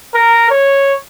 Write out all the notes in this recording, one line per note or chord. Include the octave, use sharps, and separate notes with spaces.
A#4
C#5